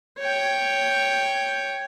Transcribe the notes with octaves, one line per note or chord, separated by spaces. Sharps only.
C#5 G5